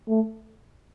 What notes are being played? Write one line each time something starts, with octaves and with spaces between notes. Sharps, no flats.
A3